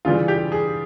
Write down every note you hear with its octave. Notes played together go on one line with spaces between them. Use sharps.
C#3 E3 G3 F4
G4
G#4